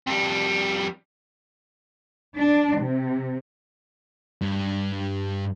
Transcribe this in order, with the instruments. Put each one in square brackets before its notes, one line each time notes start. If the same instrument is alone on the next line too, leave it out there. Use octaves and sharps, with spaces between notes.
[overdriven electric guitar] F2 G3
[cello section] D4
C3
[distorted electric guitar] G2